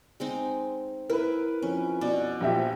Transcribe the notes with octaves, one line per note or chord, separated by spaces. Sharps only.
G#3 C4 D#4
E4 A#4 B4
F2 C#4
B2 D5
A#1 F3 G4 E5